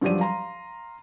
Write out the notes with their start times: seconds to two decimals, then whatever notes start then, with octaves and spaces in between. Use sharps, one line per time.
0.01 G2 F3 F#3 G4 D5 D#7
0.20 F5 A#5 C6